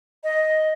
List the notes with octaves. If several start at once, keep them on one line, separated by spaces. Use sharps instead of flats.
D#5